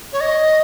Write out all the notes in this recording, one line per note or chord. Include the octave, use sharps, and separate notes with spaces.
C#5
D#5